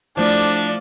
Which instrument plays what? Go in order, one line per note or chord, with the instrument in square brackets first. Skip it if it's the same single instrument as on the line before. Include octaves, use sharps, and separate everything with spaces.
[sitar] F3 [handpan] A3 E4 [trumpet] D4 [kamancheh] D5